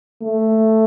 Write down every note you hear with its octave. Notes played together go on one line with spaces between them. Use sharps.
A3